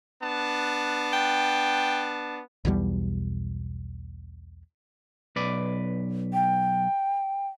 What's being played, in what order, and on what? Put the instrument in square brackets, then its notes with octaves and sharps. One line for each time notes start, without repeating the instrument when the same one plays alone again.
[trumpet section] B3 D4 A5
[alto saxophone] G5
[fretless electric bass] B1 E2 B2 G3
[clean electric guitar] B1 B4 D5
[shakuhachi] G5